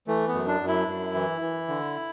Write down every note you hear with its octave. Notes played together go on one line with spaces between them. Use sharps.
E3 A3
B3
F#2
D4
F#2
E4
F#2
E3
E3
D3